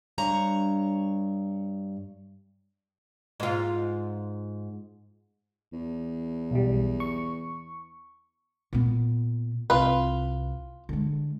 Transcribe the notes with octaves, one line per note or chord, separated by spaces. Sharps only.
G2 C#5 A#5
G#2 F4
E2
B1 G3
C#6
A#2 B3
C2 F4 B4
D3 G#3